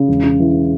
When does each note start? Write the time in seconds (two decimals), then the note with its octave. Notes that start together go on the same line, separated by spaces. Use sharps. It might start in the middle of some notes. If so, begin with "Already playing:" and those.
Already playing: C#3
0.08 E1
0.24 C#3
0.40 E3